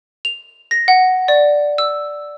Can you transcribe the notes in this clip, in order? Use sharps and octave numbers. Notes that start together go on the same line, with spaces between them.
F7
A#6
F#5
D5
E6